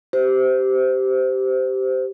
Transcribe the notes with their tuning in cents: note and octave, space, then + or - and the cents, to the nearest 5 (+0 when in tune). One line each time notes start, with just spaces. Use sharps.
G4 -15 C5 -20